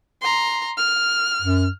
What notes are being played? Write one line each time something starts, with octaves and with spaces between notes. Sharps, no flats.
A#5 C6
F6
F#2